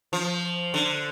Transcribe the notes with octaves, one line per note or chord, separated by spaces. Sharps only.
F3
D3